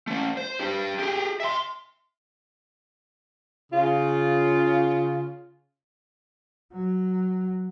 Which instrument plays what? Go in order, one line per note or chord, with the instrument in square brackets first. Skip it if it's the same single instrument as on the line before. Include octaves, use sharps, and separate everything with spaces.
[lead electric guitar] A3 C#4
C5
D4 G4
G4 G#4
E5 C6
[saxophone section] C#3 F4
[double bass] F#3